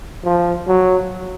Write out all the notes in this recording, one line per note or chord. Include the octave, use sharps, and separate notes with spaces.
F3
F#3